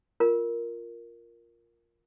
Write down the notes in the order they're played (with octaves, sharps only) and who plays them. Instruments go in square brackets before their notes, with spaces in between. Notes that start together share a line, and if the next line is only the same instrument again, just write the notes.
[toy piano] F4 A#4